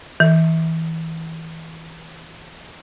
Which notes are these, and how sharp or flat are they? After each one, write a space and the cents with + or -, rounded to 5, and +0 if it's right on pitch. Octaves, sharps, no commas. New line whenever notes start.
E3 -25